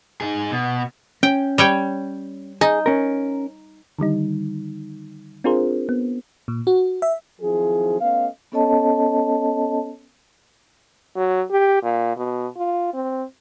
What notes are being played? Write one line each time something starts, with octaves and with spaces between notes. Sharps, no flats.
D#4 G#4
B2
C#4 G5
G3 C#5 G5
D#4 G#4
C#4 A#4
D3 D#3 G3 D#4
C4 D4 F4 G#4 A#4 C5
B3
A#2
F#4
E5
D#3 F3 F#3 C4 E4 G#4
A3 B3 C#4 D#5 F5
B3 C#4 A4 C#5 D#5 A5
F#3
G4
A#2
B2
F4
C4